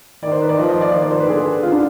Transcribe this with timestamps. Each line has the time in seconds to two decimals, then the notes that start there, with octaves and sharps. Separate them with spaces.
0.23 D#3 D5
0.32 C5
0.41 B4
0.49 D5
0.58 F3 D#5
0.70 D#5
0.81 D5
0.94 D#3 C5
1.02 D5
1.11 C5
1.20 B4
1.28 D3 G#4
1.63 F4
1.72 D4